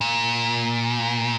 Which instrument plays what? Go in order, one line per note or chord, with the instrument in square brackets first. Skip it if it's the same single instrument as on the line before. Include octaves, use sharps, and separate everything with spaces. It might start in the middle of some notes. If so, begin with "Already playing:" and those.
[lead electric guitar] A#2